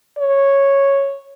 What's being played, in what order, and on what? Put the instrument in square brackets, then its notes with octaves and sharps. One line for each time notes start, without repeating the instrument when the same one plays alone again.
[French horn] C#5